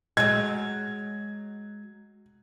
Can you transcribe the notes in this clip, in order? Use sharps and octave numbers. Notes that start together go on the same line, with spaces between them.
F#3 G#3 G#6